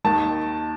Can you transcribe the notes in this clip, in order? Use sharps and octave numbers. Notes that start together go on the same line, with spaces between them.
D#2 D#3 A5